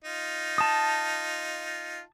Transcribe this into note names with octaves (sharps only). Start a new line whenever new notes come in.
D#4 F4
A5 D#6